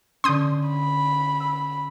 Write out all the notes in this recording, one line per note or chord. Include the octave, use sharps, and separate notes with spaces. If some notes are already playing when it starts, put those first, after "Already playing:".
D3 C#4 C6 D#6 G6
B5
E6